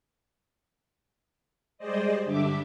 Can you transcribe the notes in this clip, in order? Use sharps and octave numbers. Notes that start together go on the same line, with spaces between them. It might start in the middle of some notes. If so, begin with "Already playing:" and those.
G3 G#3 G#4 C5 D5 D#5
G2 D3 G3 D4 E5 D6